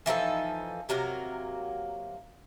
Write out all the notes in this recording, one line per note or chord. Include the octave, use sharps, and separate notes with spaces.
E3 F3 D#4 A4
C3 F#3 A#3 A#4